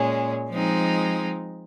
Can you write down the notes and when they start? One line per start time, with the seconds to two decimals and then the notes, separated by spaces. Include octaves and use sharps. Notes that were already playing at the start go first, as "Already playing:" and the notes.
Already playing: A#2 G#3 C#4
0.51 F3 G#3 C4 D#4